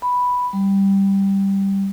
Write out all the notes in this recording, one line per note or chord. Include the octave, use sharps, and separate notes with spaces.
B5
G3